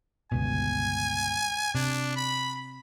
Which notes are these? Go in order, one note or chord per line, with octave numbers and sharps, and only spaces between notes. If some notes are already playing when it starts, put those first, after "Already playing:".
G1 C#2 B2 G#5
C3 D4
B5